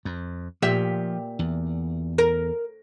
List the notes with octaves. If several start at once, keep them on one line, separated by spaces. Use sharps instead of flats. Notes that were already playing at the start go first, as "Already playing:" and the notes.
F2
A#2 F3 G4 E5
E2
A#4